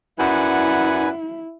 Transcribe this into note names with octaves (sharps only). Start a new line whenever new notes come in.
F#2 E4 B4 D5 F#5 G#5